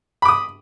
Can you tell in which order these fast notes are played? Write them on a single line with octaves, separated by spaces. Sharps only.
B5 D6 D#6